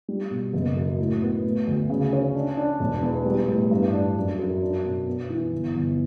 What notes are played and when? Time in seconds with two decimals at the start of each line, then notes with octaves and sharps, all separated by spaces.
0.08 G3
0.31 B2
0.53 F#1
0.77 F#2
0.99 A2
1.22 B3
1.44 A3
1.67 D2
1.90 C#3
2.13 C#4
2.35 D4
2.57 D4
2.80 E1
3.02 E2
3.26 G3
3.48 A2
3.71 G2
3.93 D4
4.17 F#2
4.39 F#2
4.62 D4
4.84 B2
5.07 B3
5.30 E3
5.52 G1
5.75 G1